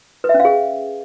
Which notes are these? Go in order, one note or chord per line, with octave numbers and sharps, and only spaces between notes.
B4
E5
C#4
F5
G#4